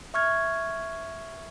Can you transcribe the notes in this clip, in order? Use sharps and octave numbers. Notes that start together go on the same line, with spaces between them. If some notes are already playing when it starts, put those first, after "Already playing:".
E5 C#6 F6 G#6